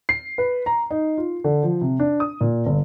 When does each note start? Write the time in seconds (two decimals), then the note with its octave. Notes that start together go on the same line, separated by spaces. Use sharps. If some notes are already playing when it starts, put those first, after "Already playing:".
0.09 C7
0.38 B4
0.66 A#5
0.91 D#4
1.18 F4
1.44 D3
1.63 F3
1.82 C3
2.00 D4
2.20 D#6
2.41 A#2
2.66 G1